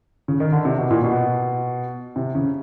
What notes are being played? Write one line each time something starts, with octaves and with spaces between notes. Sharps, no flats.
C#3
D#3
D3
C3
B2
A#2
B2
C3
C#3